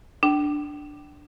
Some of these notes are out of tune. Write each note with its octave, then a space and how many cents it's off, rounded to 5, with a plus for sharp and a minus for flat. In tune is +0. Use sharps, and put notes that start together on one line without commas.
D4 +0 G5 -30